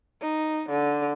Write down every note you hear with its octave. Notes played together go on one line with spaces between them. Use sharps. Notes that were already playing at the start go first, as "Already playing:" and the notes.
D#4
D3